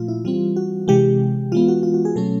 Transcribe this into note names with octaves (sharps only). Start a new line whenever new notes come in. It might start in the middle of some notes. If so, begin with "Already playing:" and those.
Already playing: A#2 F3 A3 F4
E4
E3 G3 C4 F4
F#4
C3 E3 G#3 G4
E3 G#3 B3 F4
F#4
F4
F#4
G#4
B2 F#3 A3 C#4 A4